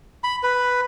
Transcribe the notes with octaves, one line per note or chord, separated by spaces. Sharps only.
B5
B4